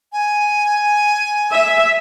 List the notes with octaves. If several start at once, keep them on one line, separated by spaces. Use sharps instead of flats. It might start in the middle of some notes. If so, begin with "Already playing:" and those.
G#5
E5